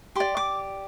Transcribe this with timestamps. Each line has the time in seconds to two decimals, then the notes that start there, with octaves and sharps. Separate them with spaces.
0.15 G4 D5 C6
0.37 D6